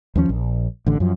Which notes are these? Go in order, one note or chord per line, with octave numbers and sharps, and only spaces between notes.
D#2 F3 B3 C#4
A#1
A1 D3
F#2 F3